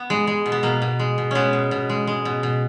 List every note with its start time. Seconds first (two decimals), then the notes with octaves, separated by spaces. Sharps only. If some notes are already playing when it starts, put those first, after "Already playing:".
Already playing: B3
0.10 G#3
0.27 G#3
0.46 B2
0.52 B3
0.63 B2 A#3
0.82 B2
0.99 G#3
1.18 B2
1.31 G#3 B3 C#4
1.53 B2
1.71 B2
1.89 G#3
2.07 G#3
2.25 B2
2.43 B2